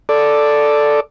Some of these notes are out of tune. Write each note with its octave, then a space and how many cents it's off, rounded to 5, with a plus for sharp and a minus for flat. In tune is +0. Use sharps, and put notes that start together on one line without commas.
A4 +0 D5 +0